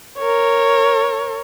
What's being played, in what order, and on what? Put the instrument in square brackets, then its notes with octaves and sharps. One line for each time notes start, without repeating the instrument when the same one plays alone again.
[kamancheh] A#4 C#5